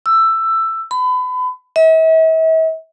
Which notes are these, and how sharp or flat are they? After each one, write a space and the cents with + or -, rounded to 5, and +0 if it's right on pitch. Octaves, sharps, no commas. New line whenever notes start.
E6 +10
B5 +30
E5 -45